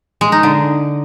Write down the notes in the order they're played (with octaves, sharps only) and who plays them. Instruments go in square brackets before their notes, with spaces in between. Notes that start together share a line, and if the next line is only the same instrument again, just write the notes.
[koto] G#3
D#4
D3